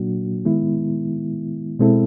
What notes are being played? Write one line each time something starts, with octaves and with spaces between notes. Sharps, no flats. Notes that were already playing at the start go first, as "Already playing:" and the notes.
Already playing: A#2 F#3 A#3 D4 F#4
D#3 G#3 B3 E4
B2 G#3 C4 E4 A4